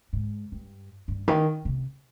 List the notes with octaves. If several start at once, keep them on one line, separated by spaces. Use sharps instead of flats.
G#2
G2
G2
D#3
C3